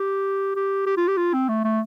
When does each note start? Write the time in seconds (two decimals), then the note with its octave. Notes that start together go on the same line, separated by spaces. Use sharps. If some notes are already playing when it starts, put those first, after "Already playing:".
Already playing: G4
0.55 G4
0.86 G4
0.97 F4
1.08 G4
1.17 F4
1.33 C4
1.49 A3
1.64 A3